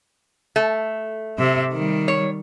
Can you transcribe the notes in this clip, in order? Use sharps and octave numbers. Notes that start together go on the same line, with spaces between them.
A3
C3 E5
D#3 G3
C#5